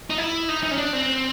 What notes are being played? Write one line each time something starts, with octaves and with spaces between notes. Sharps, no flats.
D#4
E4
D#4
D#4
C#4
D4
C4